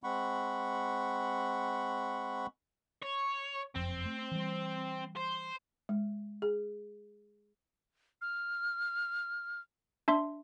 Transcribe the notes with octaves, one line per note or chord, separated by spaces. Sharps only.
G#3 C4 F#5 B5 C#6
C#5
F#1 F2 C4
A3
E3 G3
C5
G#3
G#4
F6
D4 E5 C6